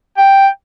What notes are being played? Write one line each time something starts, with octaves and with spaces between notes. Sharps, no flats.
G5